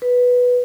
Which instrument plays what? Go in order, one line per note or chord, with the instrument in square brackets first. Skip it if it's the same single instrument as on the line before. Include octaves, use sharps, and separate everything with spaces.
[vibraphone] B4